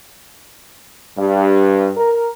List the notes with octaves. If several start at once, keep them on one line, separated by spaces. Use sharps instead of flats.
G2
A#4